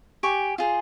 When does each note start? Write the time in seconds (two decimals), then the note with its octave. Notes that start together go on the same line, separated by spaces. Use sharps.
0.23 G4 G#5 C#6
0.58 F4 G#4 C5